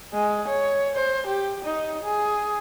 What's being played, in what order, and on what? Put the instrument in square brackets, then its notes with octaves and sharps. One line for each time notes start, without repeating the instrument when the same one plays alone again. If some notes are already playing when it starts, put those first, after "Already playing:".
[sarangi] G#3
C#5
C5
G4
D#4
G#4